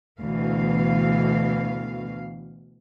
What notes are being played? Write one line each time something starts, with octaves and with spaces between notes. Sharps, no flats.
D2 B2 E3 F5